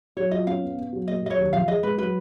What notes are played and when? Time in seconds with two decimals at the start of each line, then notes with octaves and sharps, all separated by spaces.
0.17 F#3 C#5
0.31 F4 D#5
0.47 C#4 F5
0.63 B3
0.77 B3
0.93 F#3
1.08 A#3 D#5
1.22 F#3 D#5
1.30 C#5
1.37 D#2
1.53 F3 F5
1.67 G#4 D#5
1.83 G#3 B4
1.98 F#3 B4